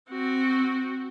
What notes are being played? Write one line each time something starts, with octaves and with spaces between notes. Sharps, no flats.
C4 F#4